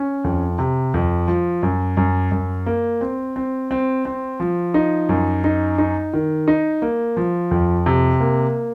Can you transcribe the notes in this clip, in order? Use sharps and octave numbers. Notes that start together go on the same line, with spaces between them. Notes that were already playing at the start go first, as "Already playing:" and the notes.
Already playing: C#4
F2
C3
F2
F3
F#2
F#2
F#2
A#3
C4
C4
C4
C4
F3
D#4
F#2
D#4
D#4
D#3
D#4
A#3
F3
F2
C3
A#3